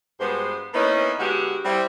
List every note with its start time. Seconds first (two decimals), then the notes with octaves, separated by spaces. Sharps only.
0.20 G2 G#3 B3 F#4 C5
0.74 A#3 B3 C#4 D#4 E4 B4
1.20 D3 G#3 B3 F#4 G4
1.65 G3 C4 E4